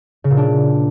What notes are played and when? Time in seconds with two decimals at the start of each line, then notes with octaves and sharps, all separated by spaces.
0.24 C#3
0.31 A#2
0.37 D4